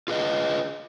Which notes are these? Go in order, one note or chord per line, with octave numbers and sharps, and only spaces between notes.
F4 G#4 B4 D#5